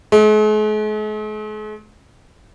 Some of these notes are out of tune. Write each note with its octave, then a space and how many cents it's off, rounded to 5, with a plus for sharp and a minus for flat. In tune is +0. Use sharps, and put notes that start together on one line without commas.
G#3 +45